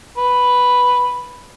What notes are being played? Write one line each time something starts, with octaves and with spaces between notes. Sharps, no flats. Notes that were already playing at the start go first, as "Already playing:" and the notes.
B4